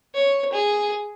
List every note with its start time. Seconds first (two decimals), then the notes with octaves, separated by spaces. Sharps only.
0.14 C#5
0.53 G#4